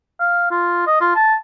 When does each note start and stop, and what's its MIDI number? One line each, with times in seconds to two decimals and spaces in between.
0.20 0.50 77
0.51 0.86 65
0.87 1.00 75
1.01 1.15 65
1.15 1.35 81